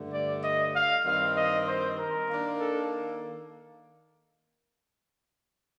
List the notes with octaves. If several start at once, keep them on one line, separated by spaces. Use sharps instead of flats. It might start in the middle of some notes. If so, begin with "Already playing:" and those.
Already playing: G2 D3 A3
D5
D#5
F5
G2 D#3 G3 C4 F5
D#5
C5
A#4
D#3 A#3 D4
A4